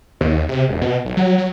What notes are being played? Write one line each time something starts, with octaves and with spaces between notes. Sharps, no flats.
D#2
C3
E1
B2
B1
F#3
F#3